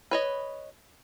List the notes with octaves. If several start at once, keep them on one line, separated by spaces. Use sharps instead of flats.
B4 C#5 D#5